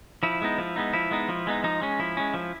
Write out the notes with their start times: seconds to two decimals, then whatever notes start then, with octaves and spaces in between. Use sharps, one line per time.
0.23 F3 E4
0.42 G#3 B3 D#4
0.58 F3
0.76 G#3 B3 D#4
0.93 F3 E4
1.11 G#3 B3 D#4
1.29 F3
1.47 G#3 B3 D#4
1.64 F3 D#4
1.82 G#3 C#4
1.99 F3 E4
2.17 G#3 C#4
2.34 F3